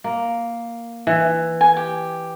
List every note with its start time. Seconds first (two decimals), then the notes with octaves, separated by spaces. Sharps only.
0.04 A#3
1.07 E3
1.61 G#5
1.77 G4